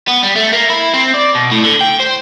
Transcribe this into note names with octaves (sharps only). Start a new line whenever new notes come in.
B3
G3
A3
A#3
E4
C4
D5
B2
A2
D3
G5
C5